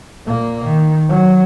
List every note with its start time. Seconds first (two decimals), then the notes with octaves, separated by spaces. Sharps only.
0.25 A#2 A#3
0.65 D#3
1.09 F#3